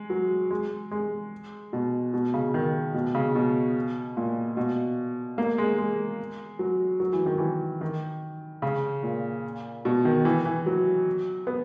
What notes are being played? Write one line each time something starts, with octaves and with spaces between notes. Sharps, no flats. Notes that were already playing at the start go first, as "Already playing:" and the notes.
Already playing: G#3
F#3
G#3
G#3
B2
B2
C#3
D#3
B2
C#3
B2
A#2
B2
A#3
G#3
G#3
F#3
F#3
E3
D#3
E3
D#3
C#3
A#2
B2
D#3
E3
E3
F#3
B3